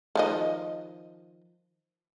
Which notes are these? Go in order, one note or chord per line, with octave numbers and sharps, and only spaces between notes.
D#3 F3 D#5